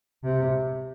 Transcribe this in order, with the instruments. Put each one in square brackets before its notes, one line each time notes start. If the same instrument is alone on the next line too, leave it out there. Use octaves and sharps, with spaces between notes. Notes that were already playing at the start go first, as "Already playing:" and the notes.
[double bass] C3